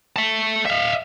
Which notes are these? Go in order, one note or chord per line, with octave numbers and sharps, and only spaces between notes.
E5 A5
E5 F5